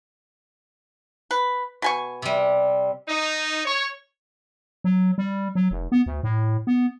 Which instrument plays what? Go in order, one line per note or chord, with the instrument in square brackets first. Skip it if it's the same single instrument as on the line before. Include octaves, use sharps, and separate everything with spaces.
[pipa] B4
B2 G#5 C#6
[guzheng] C3 G3
[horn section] D#4
C#5
[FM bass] F#3
G3
F#3
F1
B3
D2
A2
B3